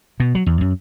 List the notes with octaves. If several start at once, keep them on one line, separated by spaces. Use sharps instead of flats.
B2
F#3
E2
F#2